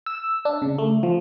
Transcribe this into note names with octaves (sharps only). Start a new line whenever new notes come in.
E6
D4
C#3
A3
F3